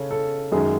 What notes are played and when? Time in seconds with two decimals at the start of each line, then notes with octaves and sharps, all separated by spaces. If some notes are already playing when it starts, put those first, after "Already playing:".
Already playing: C#3 A4 C#5
0.11 A4
0.52 F#2 D#3 G#3 G#4